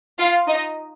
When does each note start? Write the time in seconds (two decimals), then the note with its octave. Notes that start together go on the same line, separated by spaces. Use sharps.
0.19 F4 F5
0.48 D#4 D#5